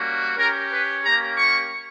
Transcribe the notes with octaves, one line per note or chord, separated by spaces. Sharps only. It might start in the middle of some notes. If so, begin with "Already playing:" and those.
Already playing: G3 A#3 C#4 F#4
C#4 G4 A#4
B4
A#3 C#4 G4 A#5
C#6